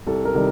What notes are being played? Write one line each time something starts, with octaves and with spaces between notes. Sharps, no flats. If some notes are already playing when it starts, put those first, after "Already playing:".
C2 A4
A#4
C3 D#3 G3